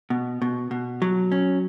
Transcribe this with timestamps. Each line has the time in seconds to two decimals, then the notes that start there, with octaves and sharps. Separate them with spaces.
0.10 B2
0.42 B2
0.71 B2
1.02 F#3
1.32 C#4